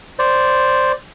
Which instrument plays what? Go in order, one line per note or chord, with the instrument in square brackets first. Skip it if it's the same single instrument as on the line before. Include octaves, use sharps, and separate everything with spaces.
[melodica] C5 D5